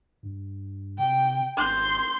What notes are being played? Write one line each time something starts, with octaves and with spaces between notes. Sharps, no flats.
G2
C3 G5
G#1 C6 G6